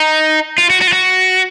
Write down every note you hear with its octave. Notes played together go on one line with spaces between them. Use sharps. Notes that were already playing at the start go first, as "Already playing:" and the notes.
Already playing: D#4
F4
F#4
F#4
F4
F#4